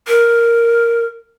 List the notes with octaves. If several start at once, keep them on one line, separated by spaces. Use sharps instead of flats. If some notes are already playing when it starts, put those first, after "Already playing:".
A#4